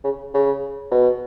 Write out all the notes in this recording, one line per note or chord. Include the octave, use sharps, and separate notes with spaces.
C#3
C#3
B2